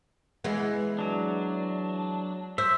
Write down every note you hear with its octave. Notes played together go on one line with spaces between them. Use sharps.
E3 G#3 B3
F#3 D4
C5 E5